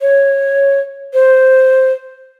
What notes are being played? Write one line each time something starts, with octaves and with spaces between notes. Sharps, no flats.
C#5
C5